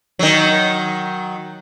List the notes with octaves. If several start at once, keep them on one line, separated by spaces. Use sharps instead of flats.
D#3 F#3